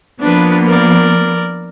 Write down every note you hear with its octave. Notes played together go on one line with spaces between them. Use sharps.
F3 A#3 B3 D4 B4
A#4 D5